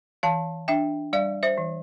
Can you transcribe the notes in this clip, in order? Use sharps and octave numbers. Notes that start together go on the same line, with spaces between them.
E3 F5 A5
D4 E5 G5
G3 D5 F5
C5 E5
E3